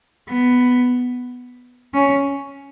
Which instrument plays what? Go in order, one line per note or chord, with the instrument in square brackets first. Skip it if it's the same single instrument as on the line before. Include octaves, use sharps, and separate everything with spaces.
[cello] B3
C#4